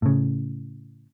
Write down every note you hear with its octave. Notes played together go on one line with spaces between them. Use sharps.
A2 C#3